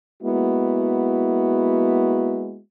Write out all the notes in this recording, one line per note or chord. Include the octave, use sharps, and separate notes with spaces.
G#3 A#3 B3 E4 F#4